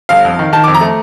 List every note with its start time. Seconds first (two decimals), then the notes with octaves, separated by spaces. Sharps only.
0.09 G1 F5
0.25 F2
0.39 D#3
0.53 D#3 A5
0.64 F2 D6
0.74 A#5
0.81 A3